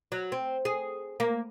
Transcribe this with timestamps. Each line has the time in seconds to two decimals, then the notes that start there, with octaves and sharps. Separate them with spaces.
0.12 F#3
0.32 C4
0.65 G#4
1.20 A#3